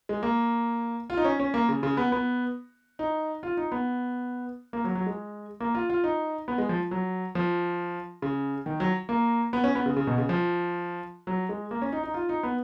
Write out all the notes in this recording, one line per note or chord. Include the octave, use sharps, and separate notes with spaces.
G#3
A#3
F4
D#4
C#4
C#4
A#3
C#3
C#3
B3
B3
D#4
F4
D#4
B3
A#3
F#3
F#3
G#3
A#3
F4
F4
D#4
B3
G#3
F3
F#3
F3
C#3
D#3
F#3
A#3
B3
C#4
B3
C#3
C#3
B2
C#3
F3
F#3
G#3
A#3
C#4
D#4
D#4
F4
D#4
B3